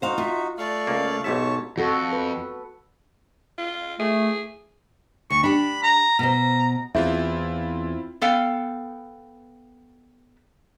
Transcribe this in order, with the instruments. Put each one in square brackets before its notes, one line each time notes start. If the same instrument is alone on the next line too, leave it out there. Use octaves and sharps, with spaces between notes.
[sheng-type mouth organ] D#4 F#4 [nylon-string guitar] C5 F5
[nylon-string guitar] F4 [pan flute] E5
[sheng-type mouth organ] A3 F5 C#6 [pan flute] D5
[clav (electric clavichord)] C#2 A#3
[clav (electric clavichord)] B1 G#2 E5 [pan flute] G4 [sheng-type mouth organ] C#5 A5 C#6
[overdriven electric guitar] F2 [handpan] F#4 A4
[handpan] B4
[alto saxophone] F4
[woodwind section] A3 [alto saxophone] G#4
[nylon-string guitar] D2 [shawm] C#6
[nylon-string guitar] D4 G4 [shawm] B5
[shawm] A#5
[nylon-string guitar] B2 C5 [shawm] A#5
[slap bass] E2 [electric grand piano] C4 E4 F4 [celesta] E5
[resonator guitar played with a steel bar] B3 A4 F5 G5